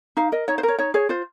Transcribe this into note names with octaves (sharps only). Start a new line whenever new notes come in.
D#4 F5
A#4 D#5
D#4 C#5
C5
A#4
C#5
D#4 C#5
G#4 C#5
F4 C5